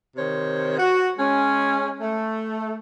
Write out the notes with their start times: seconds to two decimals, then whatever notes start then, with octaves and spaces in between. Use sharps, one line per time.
0.16 C3 D#3 C5 C#5
0.78 F#4
1.18 G#3 C#4
2.00 A3